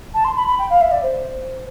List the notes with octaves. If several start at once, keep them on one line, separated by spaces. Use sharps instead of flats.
A5
C6
B5
B5
G5
F5
E5
D5
C5